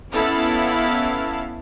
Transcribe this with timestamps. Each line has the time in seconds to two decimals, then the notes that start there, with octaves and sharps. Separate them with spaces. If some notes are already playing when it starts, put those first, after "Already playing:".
0.12 B3 C#4 E4 A4 F5 A5